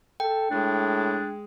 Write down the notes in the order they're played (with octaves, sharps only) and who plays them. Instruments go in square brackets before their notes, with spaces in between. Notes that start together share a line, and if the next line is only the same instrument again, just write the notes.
[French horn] A4 [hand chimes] G5
[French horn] A2 [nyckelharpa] G#3 [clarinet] D4